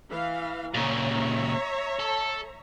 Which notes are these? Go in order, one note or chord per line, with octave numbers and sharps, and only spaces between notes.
E3 F5
A#2 C#3 C#5 E5 A#5
A4